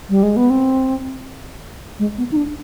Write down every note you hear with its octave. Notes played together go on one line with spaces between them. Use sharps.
G3
G#3
B3
C4
G#3
B3
D#4
D4